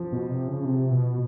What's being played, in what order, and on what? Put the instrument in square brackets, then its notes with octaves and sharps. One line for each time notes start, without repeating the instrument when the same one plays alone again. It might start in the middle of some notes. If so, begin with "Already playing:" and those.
Already playing: [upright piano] F3
[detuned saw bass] B2
C3
C#3
C3
B2